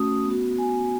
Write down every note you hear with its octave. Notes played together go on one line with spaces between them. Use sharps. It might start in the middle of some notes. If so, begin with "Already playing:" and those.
Already playing: A3 C#4 F#4 D#6
B3
F#4
G#5